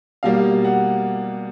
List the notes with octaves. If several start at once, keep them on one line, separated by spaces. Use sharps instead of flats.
B2 G3 A#3 F5
F#5